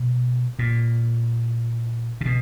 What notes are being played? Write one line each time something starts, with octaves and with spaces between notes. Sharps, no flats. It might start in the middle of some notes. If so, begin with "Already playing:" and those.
Already playing: B2
A#2
C#3
B2